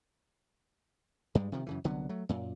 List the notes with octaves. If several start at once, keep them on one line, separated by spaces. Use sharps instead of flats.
G2 G3 G#3
C3 D#3 F3
F#2 C#3 E3
C2 D3 F#3 B3
F#3 A3
F#2 A#2